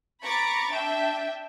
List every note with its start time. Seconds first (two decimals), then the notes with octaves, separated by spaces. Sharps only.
0.22 A#5 B5 C#6 D6 A6
0.72 D4 E5 G5